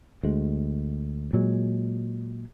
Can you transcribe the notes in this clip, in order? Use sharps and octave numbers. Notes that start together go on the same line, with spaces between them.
D2 G#3
A#2 F#3 G#3